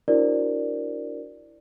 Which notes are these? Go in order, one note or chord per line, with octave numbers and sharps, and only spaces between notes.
D4 E4 F#4 A#4 C5 D5